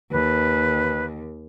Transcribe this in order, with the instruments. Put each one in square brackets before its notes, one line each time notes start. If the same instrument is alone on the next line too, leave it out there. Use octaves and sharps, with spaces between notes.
[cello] D#2 [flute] B4